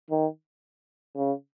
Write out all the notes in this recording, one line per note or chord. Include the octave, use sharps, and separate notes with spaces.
D#3
C#3